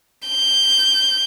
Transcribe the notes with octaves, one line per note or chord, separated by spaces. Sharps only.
G6